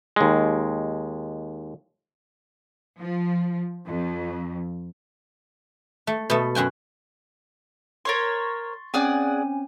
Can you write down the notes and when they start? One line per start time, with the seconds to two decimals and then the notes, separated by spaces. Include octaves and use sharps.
0.16 D#2 G#3
2.98 F3
3.87 F2
6.07 A3
6.30 B2 A3
6.55 F#2 F#4 G5 G#5
8.05 A#4 C5 C#5 C6 C#6 A6
8.94 C4 C#4 G#4 D5 F#5 G#5